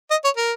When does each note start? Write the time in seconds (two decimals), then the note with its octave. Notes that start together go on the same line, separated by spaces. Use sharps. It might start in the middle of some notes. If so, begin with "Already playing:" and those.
0.11 D#5
0.25 C#5
0.37 A#4